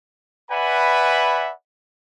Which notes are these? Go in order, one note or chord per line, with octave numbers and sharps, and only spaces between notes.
B4 D5 E5 F#5 G#5 B5